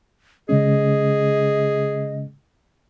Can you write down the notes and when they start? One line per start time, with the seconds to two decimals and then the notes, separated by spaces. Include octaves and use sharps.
0.49 C#3 G#3 C#4 G#4 D#5